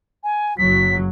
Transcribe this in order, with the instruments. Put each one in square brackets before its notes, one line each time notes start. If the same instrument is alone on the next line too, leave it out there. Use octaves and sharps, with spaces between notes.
[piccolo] G#5
[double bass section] F#1 F#3 [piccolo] B6